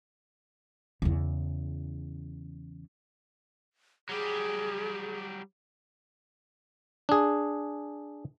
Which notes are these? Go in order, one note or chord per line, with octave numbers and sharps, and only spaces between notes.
E2 C#3
F#3 G3 G4 G#4
D4 G#4